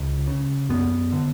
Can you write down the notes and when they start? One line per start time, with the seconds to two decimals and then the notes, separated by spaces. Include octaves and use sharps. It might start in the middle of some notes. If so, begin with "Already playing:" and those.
Already playing: C#2
0.27 C#3
0.69 F#2 B3
1.12 D3